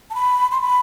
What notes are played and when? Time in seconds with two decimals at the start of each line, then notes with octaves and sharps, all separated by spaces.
0.10 A5
0.15 B5
0.51 C6
0.61 B5